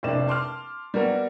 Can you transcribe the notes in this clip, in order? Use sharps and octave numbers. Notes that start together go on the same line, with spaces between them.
F1 C2 A#3 D4 D5 E7
A5 C6 D6 F6
G3 A#3 B3 F#4 A#4